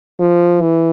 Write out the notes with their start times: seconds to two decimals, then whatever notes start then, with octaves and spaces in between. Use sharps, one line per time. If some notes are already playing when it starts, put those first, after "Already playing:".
0.20 F3
0.61 E3